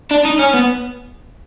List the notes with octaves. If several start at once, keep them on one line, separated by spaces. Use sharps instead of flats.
D4
D#4
C#4
B3